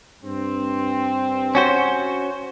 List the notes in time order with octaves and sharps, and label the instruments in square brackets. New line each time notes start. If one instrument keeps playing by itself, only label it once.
[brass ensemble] G2 C4
[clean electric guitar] C#4 F#4 C5